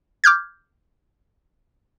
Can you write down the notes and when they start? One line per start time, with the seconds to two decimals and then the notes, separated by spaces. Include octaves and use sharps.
0.24 D6 F6 G6 G#6